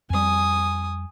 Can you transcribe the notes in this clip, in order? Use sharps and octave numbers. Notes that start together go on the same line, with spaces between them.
F2 G3 G#5 D#6